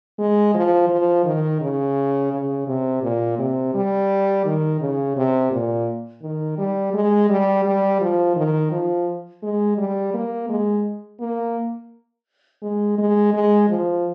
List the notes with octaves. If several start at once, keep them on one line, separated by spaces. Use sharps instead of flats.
G#3
F3
F3
D#3
C#3
C#3
C3
A#2
C3
G3
D#3
C#3
C3
A#2
D#3
G3
G#3
G3
G3
F3
D#3
F3
G#3
G3
A#3
G#3
A#3
G#3
G#3
G#3
F3